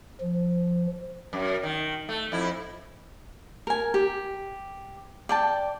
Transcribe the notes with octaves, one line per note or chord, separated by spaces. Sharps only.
F3
F#2
D#3
A3
F2 E4
A#4 G#5
G4
D5 G5 A5